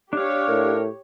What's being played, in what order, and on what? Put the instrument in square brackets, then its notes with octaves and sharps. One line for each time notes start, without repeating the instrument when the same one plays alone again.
[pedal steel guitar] D4 F5 [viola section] G4 C#5
[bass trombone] A2 [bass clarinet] A#4